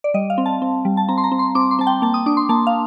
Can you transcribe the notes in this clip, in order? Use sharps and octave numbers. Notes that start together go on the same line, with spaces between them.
D5
G3 D#5
F5
C4
A5
C4
G3
A5
C4 A#5
C6
A#5
C4
C6
C4 D6
C6
C4 A5
G5
A#3 A5
D#6
D4 D6
C6
A#3 A5
F5